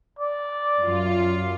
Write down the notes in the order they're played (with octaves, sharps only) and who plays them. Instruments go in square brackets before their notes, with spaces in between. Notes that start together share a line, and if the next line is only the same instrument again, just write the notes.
[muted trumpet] D5
[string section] F#2 F4